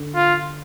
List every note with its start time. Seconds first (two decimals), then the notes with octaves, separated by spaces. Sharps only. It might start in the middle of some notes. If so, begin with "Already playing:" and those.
Already playing: D3
0.15 F4